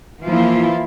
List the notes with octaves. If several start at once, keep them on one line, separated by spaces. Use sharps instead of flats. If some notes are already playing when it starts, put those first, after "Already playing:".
E3 F3 A#3 E4 F4